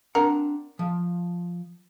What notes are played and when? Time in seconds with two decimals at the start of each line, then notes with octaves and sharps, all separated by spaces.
0.15 C4 D4 A#4 F#5
0.79 F3